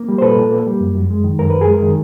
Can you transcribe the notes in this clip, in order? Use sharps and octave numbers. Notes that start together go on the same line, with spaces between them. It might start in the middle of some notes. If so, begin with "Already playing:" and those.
Already playing: A#3
G3
C5
A#2 A4 B4
A#2
A#3
G3
F#2
F#2
G#3
D#3
F#2 A#4
F#2 B4
G#4 A#4
G#3
D#3